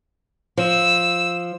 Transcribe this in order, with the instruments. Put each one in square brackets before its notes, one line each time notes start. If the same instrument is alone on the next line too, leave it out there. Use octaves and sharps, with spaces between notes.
[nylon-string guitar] F3 [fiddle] E6